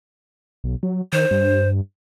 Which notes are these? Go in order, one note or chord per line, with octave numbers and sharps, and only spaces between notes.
B1
F#3
D#3 C5
G2